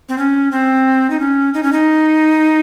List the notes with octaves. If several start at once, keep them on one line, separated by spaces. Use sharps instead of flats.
C4
C#4
C4
D#4
C#4
D#4
C#4
D#4